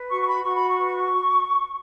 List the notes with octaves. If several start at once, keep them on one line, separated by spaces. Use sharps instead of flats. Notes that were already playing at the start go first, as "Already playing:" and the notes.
Already playing: B4
F#4 C#6
C#6
B5
F#4 C#6
B5
C#6
B4